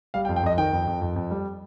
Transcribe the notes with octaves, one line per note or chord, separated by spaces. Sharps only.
G3 F5
G5
F2
G5
F2 D#5
D#3 G5
F2
F2
F2
F2
G3